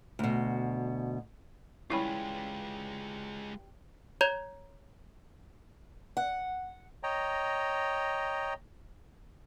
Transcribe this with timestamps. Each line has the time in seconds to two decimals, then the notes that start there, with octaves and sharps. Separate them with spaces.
0.19 D2 B2
1.90 E3 G3 G#3 C#4 E4 F4 G5 B5
4.21 C#5 A#5 G6 G#6 F7
6.17 F#5
7.03 C#5 D#5 G5 A#5